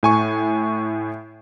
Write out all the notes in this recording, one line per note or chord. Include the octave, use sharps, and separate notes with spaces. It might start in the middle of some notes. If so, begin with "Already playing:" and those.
A2 G#5 C#6